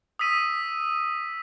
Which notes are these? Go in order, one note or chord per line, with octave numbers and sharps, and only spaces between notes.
D#6 E6 B6 D#7